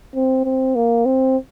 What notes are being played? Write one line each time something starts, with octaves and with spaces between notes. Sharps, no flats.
C4
C4
A#3
C4